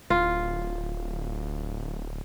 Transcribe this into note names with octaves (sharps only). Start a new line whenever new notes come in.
D1 F4